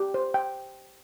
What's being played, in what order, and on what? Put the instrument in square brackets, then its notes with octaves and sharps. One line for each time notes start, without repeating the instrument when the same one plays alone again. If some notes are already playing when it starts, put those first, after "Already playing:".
Already playing: [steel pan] G4
C5
G5